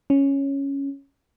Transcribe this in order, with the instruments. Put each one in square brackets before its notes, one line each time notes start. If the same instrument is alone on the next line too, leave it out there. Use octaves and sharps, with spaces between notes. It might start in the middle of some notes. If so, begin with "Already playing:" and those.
[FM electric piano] C#4